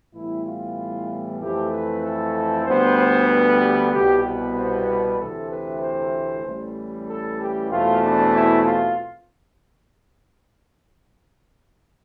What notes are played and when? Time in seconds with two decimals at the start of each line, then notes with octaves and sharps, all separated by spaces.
0.13 A2 E3 G3 B3 E4
0.45 F4
1.40 F2 E3 A3 C4 G4
1.72 B4
2.03 A4
2.66 D2 D3 G3 B3 C5
2.98 C5
3.30 B4
3.61 G4
3.92 C2 B2 G3 B3 G4
4.24 B4
4.55 C5
4.87 B4
5.19 D2 C3 E3 A3 C4 A4
5.50 B4
5.82 C5
6.44 A1 A2 E3 G3
7.08 A4
7.40 G4
7.71 E2 B2 A3 C4 F4
8.03 D4
8.34 E4
8.65 F4